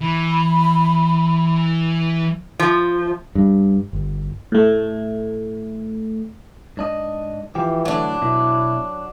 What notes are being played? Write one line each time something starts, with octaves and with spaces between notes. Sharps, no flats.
E3 B5
F3
G2
G1
A2 A3
G#2 D4 D#5
E3 F3 G4
A2 D3 F#3 D4
B2 E4